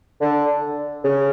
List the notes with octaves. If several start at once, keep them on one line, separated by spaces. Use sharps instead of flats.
D3
C#3